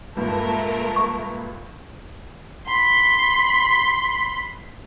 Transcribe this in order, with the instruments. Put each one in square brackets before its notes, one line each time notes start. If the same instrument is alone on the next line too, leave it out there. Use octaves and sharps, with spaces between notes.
[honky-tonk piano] C#2 G2 A#2 [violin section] A3 A#4
[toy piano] C#6
[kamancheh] B5 C6